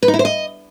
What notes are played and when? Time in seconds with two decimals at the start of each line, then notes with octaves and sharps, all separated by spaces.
0.03 B4
0.08 D#4
0.14 E4
0.19 C5
0.25 D#5